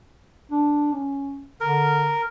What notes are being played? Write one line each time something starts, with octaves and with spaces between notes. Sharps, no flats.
D4
C#4
D3 A#4